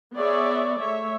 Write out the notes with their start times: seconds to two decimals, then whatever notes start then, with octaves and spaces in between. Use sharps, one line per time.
0.15 B3 G#4 C#5 D5 E5
0.78 A3 C#5 E5